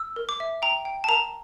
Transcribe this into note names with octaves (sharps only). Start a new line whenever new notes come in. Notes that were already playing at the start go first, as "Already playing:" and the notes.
Already playing: E6
A#4
D6
E5
G5 A#5
G5
A5
A#4 A#5